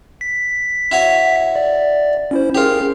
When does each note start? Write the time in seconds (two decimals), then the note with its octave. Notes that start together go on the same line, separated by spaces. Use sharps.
0.21 B6
0.91 E4 F#4 C#5
1.56 D5
2.31 C#4 E4 C5
2.55 C#4 F4 G4 G#4 A#4